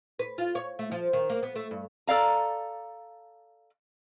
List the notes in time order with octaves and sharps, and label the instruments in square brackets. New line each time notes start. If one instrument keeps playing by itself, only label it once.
[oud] B4
F4
C#5
A3
F3
D#3
A#3
B3
A3
G2
[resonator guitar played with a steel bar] A4 D5 F5 A#5